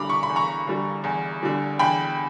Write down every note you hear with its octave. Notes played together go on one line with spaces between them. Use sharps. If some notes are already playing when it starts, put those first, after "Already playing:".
Already playing: E2 D3 G3 A#5 B5 D6
C#6
B5
E2
A#5 C#6
D3 G3
E2
D3 G3
E2 G5 B5